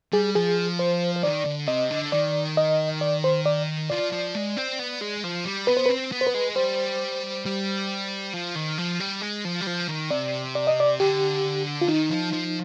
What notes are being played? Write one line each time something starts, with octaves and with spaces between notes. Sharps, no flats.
G3 G#4
F3 G#4
C5
C5
D#3 D5
D3
C3 D#5
D3
D#3 D5
D#5
D5
C5
D5
F3 D5
F3
G#3
C4
B3
G#3
F3
G3
B3 B4
C5
B4
C4
B3
C5
B4
G#3
G3 C5
G3
F3
D#3
F3
G3
G#3
F3
G3
F3
D#3
C3 D5
D5
D#5
D5
D3 G4
F4
D#3 D#4
F3
F3